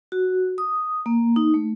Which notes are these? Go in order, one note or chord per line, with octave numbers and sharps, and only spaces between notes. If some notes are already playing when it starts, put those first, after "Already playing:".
F#4
D#6
A#3
D#4
A3